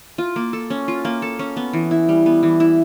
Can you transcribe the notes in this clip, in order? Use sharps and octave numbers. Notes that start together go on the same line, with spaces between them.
F4
A#3
A4
C#4
F4
A#3
A4
C#4
B3
E3
E4
G3
B3
E3
E4